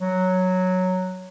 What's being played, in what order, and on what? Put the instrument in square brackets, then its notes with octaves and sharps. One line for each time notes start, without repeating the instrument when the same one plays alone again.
[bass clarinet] F#3